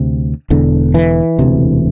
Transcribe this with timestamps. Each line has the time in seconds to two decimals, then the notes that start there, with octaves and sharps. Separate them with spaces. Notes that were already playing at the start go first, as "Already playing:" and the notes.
Already playing: D2 C3
0.50 E1 E2 D3
0.94 E3
1.39 E1 D2 C3